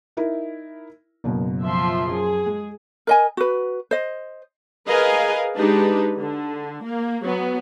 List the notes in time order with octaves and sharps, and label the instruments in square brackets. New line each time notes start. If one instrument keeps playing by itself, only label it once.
[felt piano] D#4 E4 A#4
F#1 F#2 B2
[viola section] F3 E5 C6
[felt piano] F#2 [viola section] G#4
[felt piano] G#3
[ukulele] A#4 D#5 G#5
F#4 B4
C5 D#5
[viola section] G#4 A#4 B4 D#5 F5 G#5
G#3 D4 D#4 G4 B4
D3
A#3
F#3 B3